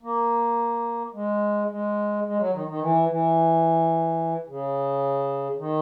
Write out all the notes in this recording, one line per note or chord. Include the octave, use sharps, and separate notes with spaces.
A#3
G#3
G#3
G#3
F#3
D#3
D#3
E3
E3
C#3
D#3